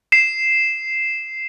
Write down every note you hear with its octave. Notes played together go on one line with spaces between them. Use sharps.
C7 E7